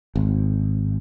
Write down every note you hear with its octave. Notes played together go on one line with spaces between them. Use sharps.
G#1